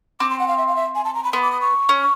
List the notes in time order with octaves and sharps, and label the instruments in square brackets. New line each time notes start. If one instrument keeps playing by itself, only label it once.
[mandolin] C4 [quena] D6
[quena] C6
F#5
F5
E5
F5
E5
G#5
A5
A#5
B5
[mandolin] B3 [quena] C6
[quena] D6
D#6
C#6
[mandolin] C#4